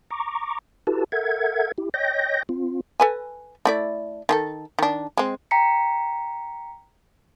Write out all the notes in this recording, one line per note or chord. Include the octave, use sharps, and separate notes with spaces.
A#5 C#6 D6
E4 F#4 G4 A4 B4 A5
A4 A#4 E5 F#5 G#6
E4 G4
C#5 D#5 G5 G6 A#6
C4 F4
A4 B4 G#5
A3 E4 D5
D#3 G#4 A4
D#3 D4
G#3 C4
G5 A#5 B6 C#7